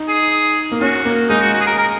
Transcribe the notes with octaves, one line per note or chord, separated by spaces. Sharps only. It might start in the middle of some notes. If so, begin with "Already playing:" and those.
Already playing: D#4
G#4
A#3
C#4 F#4
A#3
G#3 D#4
F#4
F#4
G#4
A#4
A#4